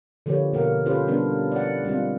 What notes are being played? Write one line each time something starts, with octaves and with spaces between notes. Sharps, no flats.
D3 F3 A#3 G4 B4 C#5
B2 A#3 A#4 F#5
C#4 F4 G4 A4 B4 C5
G3 B3 D4 A#4
D5 F#5
G3 G#3 C4 F4